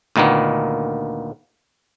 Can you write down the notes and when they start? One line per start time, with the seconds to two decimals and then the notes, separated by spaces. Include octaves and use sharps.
0.16 D2 A#2 D#3 A#3 B3